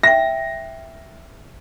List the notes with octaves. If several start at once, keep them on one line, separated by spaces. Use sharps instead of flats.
E5 G5 A#6